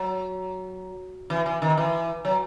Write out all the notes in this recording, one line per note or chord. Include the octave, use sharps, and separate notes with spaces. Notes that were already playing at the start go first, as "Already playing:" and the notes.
Already playing: F#3
E3
E3
D#3
E3
F#3